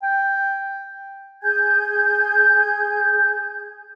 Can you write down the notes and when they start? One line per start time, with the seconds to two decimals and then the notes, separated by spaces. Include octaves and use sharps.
0.03 G5
1.42 G#4 G#5 G6 G#6